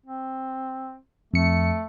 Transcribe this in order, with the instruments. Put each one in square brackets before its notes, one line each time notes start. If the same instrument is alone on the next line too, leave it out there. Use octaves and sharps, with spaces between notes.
[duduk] C4
[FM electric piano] F2 C#7 [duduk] A3